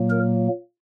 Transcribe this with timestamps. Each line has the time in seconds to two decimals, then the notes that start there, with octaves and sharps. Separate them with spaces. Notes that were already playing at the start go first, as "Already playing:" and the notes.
Already playing: A#2 F#3 A#3
0.10 A#4